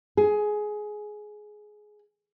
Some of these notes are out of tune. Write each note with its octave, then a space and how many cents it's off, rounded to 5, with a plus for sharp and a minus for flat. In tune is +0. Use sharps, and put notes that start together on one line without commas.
G#4 +15